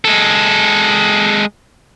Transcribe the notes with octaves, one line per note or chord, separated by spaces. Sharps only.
G#3 A4